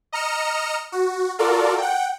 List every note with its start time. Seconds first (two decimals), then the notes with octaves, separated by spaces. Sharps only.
0.13 D#5 A#5 F6 C#7 E7
0.92 F#4
1.39 F4 F#4 A4 A#4 D5
1.78 F#5 G5